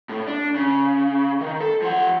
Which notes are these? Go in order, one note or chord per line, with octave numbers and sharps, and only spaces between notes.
A2
D4
C#3
D#3
A4
F3 F#5